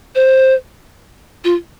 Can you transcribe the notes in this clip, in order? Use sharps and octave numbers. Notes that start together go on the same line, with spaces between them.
C5
F4